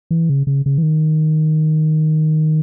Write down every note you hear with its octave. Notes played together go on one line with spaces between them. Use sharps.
E3
C#3
C#3
C#3
E3
D#3